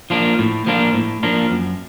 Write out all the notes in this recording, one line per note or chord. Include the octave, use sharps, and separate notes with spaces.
F3 A#3 D4 F4
A2
F3 A#3 D4 F4
A2
F3 A#3 D4 F4
F#2